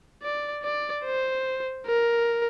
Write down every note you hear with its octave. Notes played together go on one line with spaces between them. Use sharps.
D5
D5
C5
A#4